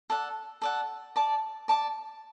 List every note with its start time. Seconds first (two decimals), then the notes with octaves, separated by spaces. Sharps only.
0.10 A4 D5 F#5
0.62 A4 D5 F#5
1.16 D5 A5 D6
1.68 D5 A5 D6